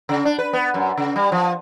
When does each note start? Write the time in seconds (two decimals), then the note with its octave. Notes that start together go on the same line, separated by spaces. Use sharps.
0.09 C#3
0.25 D4
0.38 B4
0.53 B3
0.74 F#2
0.97 C#3
1.16 G3
1.32 F3